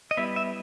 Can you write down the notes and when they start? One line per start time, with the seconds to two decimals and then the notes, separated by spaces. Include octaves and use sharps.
0.11 D#5
0.17 G3 B3 E4 E5
0.36 E5